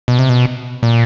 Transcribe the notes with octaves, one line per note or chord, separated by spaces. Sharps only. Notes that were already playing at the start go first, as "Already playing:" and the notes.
B2
C3
B2
A#2